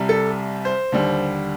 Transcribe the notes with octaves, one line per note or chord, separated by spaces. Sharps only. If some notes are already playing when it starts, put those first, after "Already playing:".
Already playing: C2 C3 G3
A4
C5
D#2 D3 G3